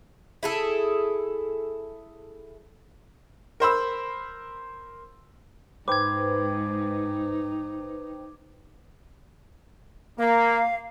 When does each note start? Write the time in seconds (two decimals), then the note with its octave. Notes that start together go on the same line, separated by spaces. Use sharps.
0.43 E4 G#4 A4
3.60 A#4 C5 B5 E6
5.88 G#2 D#4 B4 C5 G5 D6 G#6
10.19 A#3 F5